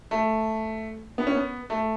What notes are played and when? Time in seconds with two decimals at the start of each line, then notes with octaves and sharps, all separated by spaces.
0.11 A3
1.18 B3
1.27 C#4
1.35 B3
1.70 A3